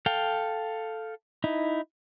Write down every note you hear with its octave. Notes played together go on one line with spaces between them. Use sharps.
A4 F5 G5
D#4 E4